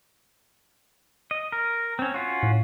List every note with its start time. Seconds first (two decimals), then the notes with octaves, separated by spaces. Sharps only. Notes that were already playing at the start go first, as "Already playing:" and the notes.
1.31 D#5
1.52 A#4
1.99 C4 C#4
2.14 C#4 F4 F#4
2.43 A2